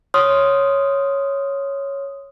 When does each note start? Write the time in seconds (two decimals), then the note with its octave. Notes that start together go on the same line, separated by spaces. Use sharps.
0.14 C#5 C6 D#6 F6